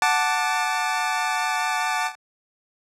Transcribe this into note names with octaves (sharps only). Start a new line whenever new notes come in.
F#5 A5 D6